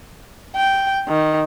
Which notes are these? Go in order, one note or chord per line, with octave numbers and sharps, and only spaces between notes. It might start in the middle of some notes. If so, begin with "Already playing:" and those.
G5
D#3